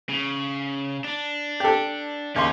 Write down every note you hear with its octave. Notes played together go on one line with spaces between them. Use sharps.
C#3
D4
G4 A4
D#2 C#3 C#4 C6